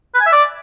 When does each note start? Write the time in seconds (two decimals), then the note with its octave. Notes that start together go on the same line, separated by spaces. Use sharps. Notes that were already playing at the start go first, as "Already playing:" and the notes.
0.14 B4
0.20 G#5
0.26 E5
0.32 D5